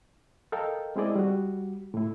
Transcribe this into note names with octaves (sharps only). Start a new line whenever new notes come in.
A4 A#4 D#5 F5 G5
G#3 C4 E4 G#4 D5 D#5
G3 F#4
A2 E4